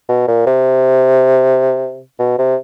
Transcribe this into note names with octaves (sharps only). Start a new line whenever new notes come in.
B2
A#2
C3
B2
C3